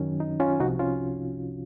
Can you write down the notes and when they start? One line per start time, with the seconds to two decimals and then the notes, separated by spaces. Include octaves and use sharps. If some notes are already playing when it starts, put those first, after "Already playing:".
Already playing: F#2 D#3 F#3 C#4
0.20 D#4
0.40 C#4 F4
0.60 C2 C3 F3 D#4 F#4
0.79 C#4 F4